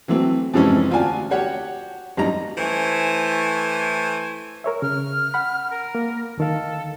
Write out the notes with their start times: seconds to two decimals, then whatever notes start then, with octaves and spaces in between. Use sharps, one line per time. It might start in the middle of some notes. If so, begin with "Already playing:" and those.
0.08 E3 F#3 A3 C4
0.54 F2 G#2 C3 E3 C#4
0.91 D2 F4 F#4 D5 G#5 A5
1.30 F#4 G4 C#5 F#5
2.17 A1 F#2 G3 D#4 A#5
2.58 E3 A3 C5 G#5
4.64 A#4 C#5 E5
4.82 C#3 F6
5.34 F#5 B5
5.71 A#4
5.95 A#3
6.37 D2 D#3 A4 F5